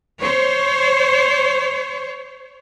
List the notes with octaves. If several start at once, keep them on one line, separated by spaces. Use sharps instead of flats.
C5 C#5